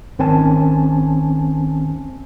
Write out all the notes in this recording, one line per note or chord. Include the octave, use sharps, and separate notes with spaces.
G#1 D#3 C4 C#4 G#5 A5